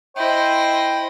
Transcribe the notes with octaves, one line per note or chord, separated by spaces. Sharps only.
E4 C5 D#5 G5